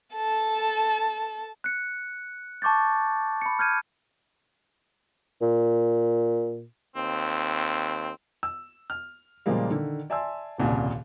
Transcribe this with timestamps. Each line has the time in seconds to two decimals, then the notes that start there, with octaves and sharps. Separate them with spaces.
0.15 A4 A5
1.64 F#6 C#7
2.62 A5 C#6 D6 G6 A6
3.42 B5 C#7
3.59 F6 G6 G#6 D#7
5.42 A#2
6.96 D#2 C4
8.43 E6
8.90 F6
9.46 A#2 C#3 F3 G3 G#3 A#3
9.71 D3 D#3
10.10 D5 E5 G#5 A5 C6 E6
10.58 D#1 C2 A#2 C#3